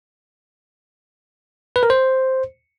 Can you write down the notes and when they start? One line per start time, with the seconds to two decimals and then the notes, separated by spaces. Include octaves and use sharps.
1.76 B4
1.83 A#4
1.90 C5